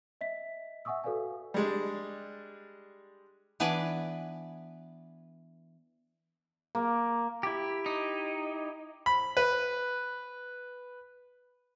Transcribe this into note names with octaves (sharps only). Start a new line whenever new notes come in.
D#5 E5 B6
E5 F#5 G#5 C#6 D#6 E6
F#4 A4 B4 D5 F5 G#5
G3 G#3 D4
E3 B3 D4 B4 D5 G#5
A#3
E4 G4
D#4
B5
B4